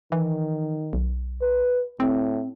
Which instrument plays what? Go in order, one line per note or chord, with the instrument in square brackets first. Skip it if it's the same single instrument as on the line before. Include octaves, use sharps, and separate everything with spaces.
[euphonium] D#3 [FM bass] E3
[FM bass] B1
[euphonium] B4
[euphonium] A2 [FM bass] C4